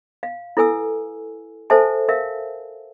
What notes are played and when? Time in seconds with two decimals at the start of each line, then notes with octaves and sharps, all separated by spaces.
0.23 F5
0.57 E4 A4 B4 G#5 E6
1.70 A4 C5 E5 G#5 A5
2.09 A#4 E5 F5